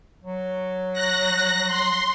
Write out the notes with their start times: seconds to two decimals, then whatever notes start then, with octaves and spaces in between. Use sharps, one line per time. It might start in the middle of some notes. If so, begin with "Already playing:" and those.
0.24 F#3
0.93 F#6 A#6
1.68 C6